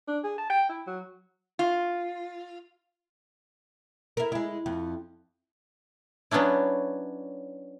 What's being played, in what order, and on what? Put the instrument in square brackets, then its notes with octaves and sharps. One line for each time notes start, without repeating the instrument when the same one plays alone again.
[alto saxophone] D4
G#4
A5
G5
E4
F#3
[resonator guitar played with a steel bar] F4
[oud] E4 A#4
G#3 E4
F2
[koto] F#3 B3 C#4 D4 E4